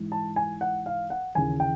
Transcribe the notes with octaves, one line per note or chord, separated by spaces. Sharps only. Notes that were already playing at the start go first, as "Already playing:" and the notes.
Already playing: G#2 E3
A5
G#5
F#5
F5
F#5
D#2 C#3 E3 G#5
G5